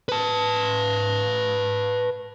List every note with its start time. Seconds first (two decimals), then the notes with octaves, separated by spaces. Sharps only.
0.09 B4 A5